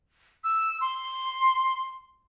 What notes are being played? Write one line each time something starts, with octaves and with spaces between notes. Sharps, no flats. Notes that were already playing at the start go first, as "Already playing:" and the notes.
E6
C6